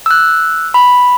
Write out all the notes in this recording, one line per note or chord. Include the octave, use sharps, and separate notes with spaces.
E6 F#6
B5